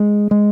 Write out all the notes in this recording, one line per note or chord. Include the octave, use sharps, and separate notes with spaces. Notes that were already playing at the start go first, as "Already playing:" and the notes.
Already playing: G#3
G#3